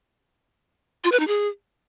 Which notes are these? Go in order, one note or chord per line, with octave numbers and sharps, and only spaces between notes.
F4
B4
D#4
G#4